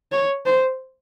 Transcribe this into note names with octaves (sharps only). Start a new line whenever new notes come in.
C#5
C5